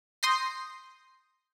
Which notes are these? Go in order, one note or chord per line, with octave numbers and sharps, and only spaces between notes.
C6 D#6 G6 A#6 C7